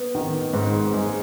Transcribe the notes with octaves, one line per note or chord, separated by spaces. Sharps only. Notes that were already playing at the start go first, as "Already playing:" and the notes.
Already playing: B3
D#3
G#2
G#3